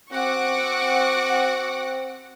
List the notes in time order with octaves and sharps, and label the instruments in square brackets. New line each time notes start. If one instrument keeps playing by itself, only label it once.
[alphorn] C4 [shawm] F#4 [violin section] F#5 [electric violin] C#6 D6